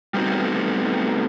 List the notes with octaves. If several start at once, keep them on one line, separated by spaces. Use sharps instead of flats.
G3 A3 B3 C4 D#4 F#4